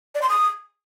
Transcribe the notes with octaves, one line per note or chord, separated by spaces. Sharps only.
D5
C6
D#6